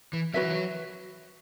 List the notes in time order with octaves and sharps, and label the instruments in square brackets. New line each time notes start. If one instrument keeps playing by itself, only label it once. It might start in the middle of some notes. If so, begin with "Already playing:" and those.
[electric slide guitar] E3
[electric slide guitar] F#3 [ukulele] F#4 B4 E5
[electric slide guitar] E3
F#3